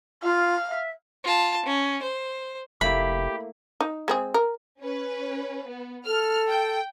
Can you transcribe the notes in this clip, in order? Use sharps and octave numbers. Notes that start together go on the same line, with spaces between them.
F4 F5
E5
F4 A5
C#4
C5
F1 A3 A#3 E4 G4 B5
D#4
G#3 C4 G#4
A#4
C#4 B4
B3
A4 F6
G5